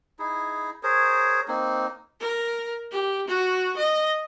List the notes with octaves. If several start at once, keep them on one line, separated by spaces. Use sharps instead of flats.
D#4 E4 G#4
G#4 A#4 C5 C#5
A#3 C4 D#4
A#4
G4
F#4
D#5